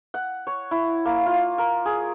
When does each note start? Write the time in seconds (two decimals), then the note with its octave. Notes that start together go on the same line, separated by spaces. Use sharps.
0.14 F#5
0.47 C#5
0.71 E4
1.05 A#3
1.26 F4
1.58 A#4
1.86 G#4